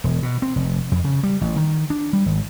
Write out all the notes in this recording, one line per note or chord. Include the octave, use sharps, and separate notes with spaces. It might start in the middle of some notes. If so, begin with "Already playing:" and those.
E1
B2
C4
F1
F2
C#3
G3
A1
D#3
D4
G3
G#1